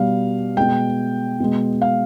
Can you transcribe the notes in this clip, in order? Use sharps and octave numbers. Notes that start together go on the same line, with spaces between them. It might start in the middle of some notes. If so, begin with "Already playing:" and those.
Already playing: B2 G3 F5
B2 G#3 G5
B2 G#3
F5